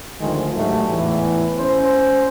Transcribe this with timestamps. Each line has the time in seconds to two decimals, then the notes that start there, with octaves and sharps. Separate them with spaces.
0.20 D2 D#3 F3 G#3
0.57 G#2 F#3 G3 A3
0.88 E2 A2 E3
1.59 C#4 C5